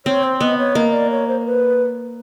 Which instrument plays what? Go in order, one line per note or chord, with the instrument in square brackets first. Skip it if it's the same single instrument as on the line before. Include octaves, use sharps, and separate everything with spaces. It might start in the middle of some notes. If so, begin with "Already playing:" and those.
[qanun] C4 [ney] C#5
[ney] C5
[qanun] B3 [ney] D#5
[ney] C#5
[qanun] A#3 [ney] D#5
[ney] D5
C#5
C5
C5
B4